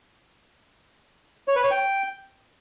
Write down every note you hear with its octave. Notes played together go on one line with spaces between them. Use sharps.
C#5
B4
C#5
G5